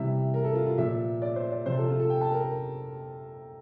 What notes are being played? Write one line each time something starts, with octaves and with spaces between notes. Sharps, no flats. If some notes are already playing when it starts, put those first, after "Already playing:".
Already playing: C3 E3 G3 E5
A#4
A4
F4
F4
A#2 F3 E5
D5
C5
D5
C3 F3 C5
A4
F4
A4
G5
A5
A#4